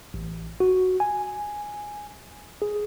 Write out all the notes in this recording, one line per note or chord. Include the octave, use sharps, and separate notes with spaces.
A1
F#4
G#5
G#4